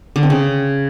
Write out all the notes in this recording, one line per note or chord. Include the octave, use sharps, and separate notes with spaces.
D3
C4
C#3